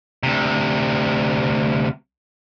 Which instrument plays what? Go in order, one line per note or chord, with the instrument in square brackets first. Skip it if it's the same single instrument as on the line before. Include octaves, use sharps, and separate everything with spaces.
[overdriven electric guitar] D2 C3